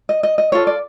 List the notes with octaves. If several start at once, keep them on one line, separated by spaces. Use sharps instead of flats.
D#5
D#5
D#5
F4 A4 C#5
D5